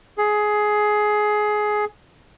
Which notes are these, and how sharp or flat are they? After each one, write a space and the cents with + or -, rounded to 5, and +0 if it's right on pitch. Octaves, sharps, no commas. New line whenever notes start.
G#4 +15